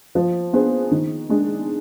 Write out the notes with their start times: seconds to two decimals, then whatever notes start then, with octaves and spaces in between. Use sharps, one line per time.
0.15 F3
0.53 B3 D4 G#4 C5
0.91 D#3
1.29 G#3 D4 G#4